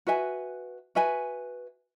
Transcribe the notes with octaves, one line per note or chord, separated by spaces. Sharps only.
F#4 B4 E5 G#5
F#4 B4 E5 G#5